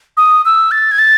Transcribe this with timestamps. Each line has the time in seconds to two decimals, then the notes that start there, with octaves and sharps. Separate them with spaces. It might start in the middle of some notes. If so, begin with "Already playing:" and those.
0.17 D#6
0.45 E6
0.71 A6
0.91 G#6
0.99 A6